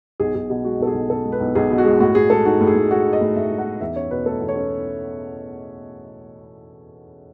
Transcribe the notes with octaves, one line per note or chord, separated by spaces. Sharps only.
B1 G#4
B1 G#4
B2 G#4
G#3 F#4
B1 A4
G#4
B1
B2 A4
G#3
B4
B1
B1 G#4
B2
F#4
G#3
A2 F#4
A2 G#4
G#3 A4
D#4 F#4
A2
G#4
A2
G#3 F#4
D#4
D#5
A2
A2 E5
G#3
F#5
D#4
E2 E5
C#4 C#5
B2 B4
A3 A4
E2
C#5
C#4